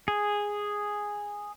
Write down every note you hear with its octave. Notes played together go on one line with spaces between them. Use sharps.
G#4